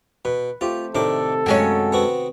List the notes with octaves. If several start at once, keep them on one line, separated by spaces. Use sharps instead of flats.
B2 B4
A3 C4 F4 G4
A2 C3 D#3 D4 A4 D6
F#2 G#3 C#4 F5 G5
B3 C4 F#4